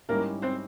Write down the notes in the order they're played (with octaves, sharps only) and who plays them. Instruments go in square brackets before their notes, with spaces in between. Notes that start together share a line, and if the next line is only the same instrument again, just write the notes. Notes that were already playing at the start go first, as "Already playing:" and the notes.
[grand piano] G#2 G3 C#4 E4 [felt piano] A#3 A#4
[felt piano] C4 C5